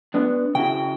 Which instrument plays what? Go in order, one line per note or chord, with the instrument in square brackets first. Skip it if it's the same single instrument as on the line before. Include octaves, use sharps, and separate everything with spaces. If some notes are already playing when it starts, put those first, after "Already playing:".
[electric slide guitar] B3 D4
[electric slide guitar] C#3 E4 F#4 [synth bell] G5